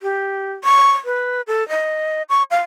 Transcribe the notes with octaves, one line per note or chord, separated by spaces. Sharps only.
G4
C#6
B4
A4
D#5
C#6
F5